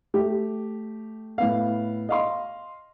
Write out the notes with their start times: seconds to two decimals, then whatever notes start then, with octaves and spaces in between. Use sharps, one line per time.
0.14 A3 G4
1.38 A2 B3 F5
2.09 D#5 F5 C6